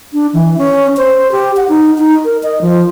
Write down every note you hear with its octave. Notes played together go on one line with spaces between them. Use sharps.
D4
E3
C#4
C5
G4
F#5
D#4
D#4
A#4
D#5
F3